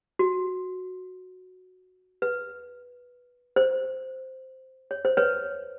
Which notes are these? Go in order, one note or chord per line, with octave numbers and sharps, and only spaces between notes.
F#4
B4
C5
C#5
C5
B4 C#5